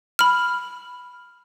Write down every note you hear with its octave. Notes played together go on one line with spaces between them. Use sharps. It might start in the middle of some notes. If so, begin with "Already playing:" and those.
B5 F6